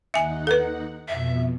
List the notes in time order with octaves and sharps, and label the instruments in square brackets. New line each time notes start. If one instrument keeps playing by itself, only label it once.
[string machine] D#2 D#4 F#5 [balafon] E5 G#5
[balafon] A4 B4
[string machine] F2 B2 [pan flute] E5